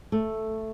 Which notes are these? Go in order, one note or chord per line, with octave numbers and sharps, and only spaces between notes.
A3